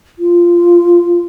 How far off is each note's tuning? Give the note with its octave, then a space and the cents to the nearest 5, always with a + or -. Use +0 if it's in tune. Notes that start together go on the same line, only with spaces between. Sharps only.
F4 -10